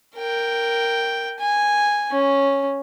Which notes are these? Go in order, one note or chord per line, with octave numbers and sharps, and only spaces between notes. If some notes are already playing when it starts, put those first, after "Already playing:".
A#4 G5
G#5
C#4